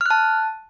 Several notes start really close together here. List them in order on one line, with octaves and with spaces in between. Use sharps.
F6 F#6 A5